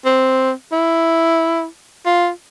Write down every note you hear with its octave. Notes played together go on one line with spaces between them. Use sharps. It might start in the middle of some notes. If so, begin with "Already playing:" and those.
C4
E4
F4